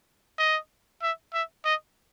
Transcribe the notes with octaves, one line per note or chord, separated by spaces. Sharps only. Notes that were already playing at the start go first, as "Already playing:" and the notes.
D#5
E5
E5
D#5